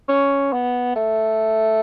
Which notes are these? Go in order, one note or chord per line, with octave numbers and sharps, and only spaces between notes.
C#4
B3
A3